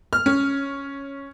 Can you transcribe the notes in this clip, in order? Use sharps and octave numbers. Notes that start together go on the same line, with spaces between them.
F6
C#4